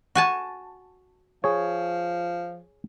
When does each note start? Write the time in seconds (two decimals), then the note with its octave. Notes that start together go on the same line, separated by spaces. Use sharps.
0.15 F#4 G#5 A5
1.44 F3 G#4 C#5